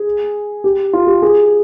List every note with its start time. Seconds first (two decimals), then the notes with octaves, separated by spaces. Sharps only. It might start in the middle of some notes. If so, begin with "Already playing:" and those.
Already playing: G#4
0.64 G4
0.93 F4
1.07 G4
1.22 G#4